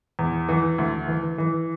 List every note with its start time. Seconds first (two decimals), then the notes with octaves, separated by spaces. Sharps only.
0.19 E2
0.49 E3
0.78 D2
1.08 E3
1.38 E3